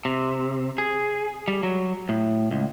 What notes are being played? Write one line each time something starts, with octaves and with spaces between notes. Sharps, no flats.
C3
G#4
G3
F#3
A2
C#2